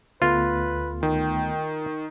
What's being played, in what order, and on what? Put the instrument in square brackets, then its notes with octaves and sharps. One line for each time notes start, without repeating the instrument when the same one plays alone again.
[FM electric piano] D2 A3 B3 [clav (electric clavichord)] F4 [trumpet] B4
[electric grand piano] D#3 [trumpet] G5